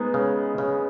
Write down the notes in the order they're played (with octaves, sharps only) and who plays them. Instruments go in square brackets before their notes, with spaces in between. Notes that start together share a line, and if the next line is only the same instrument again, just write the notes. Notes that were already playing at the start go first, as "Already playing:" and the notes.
Already playing: [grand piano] G#3 B3 [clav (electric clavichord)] D#4
[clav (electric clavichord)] C#3
C#3